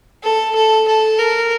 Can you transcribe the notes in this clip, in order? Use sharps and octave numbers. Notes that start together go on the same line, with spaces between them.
A4
A4
A4
A#4